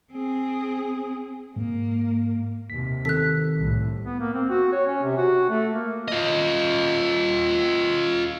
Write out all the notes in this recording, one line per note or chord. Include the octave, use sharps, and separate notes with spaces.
C4 G#4
G#2 A#3
D#2 C3 B6
D#3 C4 A4 F#6 B6
C2 A2
B3
A#3
C4
F#4
C#5
C#4
C3
F#4
A3
A#3
F4 D#5